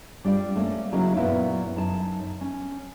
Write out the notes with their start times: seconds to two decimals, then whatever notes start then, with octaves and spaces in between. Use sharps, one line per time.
0.25 G3 D4 F4 D5
0.56 A3 A#3 C#4
0.92 C#3 F#3 A#3 C#4 D#4 E4
1.17 F#2 A#2 A#3 B3 E4
1.76 F#2 D#4 A5
2.41 C#4